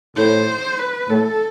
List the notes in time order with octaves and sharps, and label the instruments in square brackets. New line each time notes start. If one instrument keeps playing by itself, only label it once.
[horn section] A2 [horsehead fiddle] C5
[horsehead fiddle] B4
[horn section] A2 [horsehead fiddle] A4